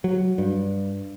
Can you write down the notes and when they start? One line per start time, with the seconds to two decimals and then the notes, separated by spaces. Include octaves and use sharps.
0.04 F#3
0.38 G2